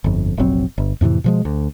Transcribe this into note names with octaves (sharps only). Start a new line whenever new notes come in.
G1 F2
F1 A#1 F#3 C4
G1
F2 A2 C3 E3
B2 F3 G#3
D2